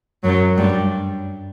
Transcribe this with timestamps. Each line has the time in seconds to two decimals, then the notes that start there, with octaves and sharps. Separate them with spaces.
0.23 F#2 F#3
0.58 G2 G3